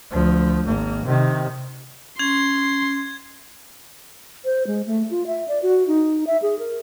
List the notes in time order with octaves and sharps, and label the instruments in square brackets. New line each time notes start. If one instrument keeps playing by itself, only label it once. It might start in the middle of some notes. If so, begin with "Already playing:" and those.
[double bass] D2 F3
G#1 A#3
C3 D#3
[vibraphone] C#4 [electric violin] C6 [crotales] G#6
[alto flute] C5
G#3
A3
F4
E5
D5
F#4
D#4
E5
G#4
A#4